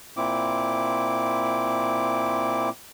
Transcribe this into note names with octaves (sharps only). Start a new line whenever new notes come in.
A#2 C4 E4 D6